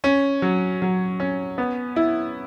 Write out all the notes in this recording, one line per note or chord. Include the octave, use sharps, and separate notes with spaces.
C#4
F#3
F#3
C#4
B3
E4